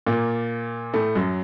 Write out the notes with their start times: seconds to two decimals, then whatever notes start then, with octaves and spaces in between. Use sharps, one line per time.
0.07 A#2 A#3
0.94 A2 A3
1.15 F#2 F#3